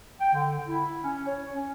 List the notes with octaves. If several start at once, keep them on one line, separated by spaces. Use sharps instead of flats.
G5
D3
E4
C#4
C#5
C#4